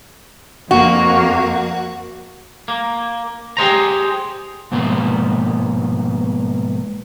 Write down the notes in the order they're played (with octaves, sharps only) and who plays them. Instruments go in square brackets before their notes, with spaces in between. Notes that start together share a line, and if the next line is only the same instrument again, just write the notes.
[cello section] F2 A#3 [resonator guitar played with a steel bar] F#4
[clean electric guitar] A#3
G4 G#4 C5 A#5
[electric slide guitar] G#2 B2 F3 A#3 B3